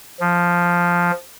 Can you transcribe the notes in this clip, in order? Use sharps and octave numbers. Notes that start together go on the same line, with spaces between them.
F3